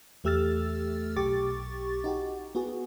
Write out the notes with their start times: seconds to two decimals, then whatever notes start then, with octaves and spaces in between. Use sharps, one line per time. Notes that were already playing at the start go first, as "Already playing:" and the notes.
0.24 E2 A3 G4 E6 F6 A6
1.16 B1 G4 C#6 D6 A6
2.04 D#4 F#4 G4
2.55 B3 F#4 G#4